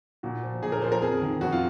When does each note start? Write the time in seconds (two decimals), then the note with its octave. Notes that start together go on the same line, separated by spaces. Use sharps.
0.23 A#2 F#4
0.43 F3
0.62 A#2 G#4
0.72 A#4
0.82 F3 C5
0.92 A#4
1.02 F2 G#4
1.21 D#3
1.41 F2 F#4
1.52 F4